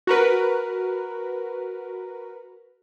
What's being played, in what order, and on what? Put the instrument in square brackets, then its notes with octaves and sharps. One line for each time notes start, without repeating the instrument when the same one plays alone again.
[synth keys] F#4 A#4 B4